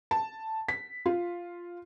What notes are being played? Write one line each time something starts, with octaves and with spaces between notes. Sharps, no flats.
A5
B6
F4